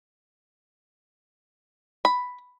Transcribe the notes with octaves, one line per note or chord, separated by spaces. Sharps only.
B5